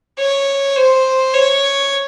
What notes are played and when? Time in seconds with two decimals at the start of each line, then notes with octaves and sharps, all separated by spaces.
0.18 C#5
0.76 C5
1.34 C#5